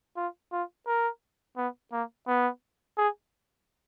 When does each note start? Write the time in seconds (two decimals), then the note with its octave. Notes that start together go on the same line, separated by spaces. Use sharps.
0.17 F4
0.52 F4
0.87 A#4
1.57 B3
1.92 A#3
2.28 B3
2.98 G#4